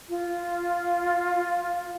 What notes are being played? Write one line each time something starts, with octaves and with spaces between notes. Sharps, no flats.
F4